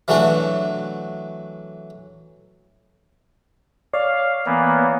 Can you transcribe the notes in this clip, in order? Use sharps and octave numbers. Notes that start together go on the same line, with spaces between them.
E3 F#3 A3 D4 F#4
C#5 D5 F5
E3 A#3 B3